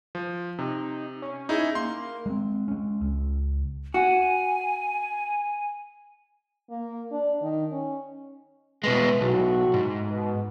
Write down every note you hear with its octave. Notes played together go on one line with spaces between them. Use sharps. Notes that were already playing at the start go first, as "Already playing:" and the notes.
F3
C3 D#4
C#4
D#4 E4 G#4
A#3 C6
G#3 C4
G#3 C#4
C#2
F#4 G#5
A#3
D4
D#3
C#4
B2 G#3 A3 G#4 B4
B1 A2 F#4
G#2
B2